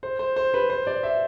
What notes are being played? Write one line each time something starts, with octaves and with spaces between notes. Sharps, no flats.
C5
C5
C5
B4
C5
D5
E5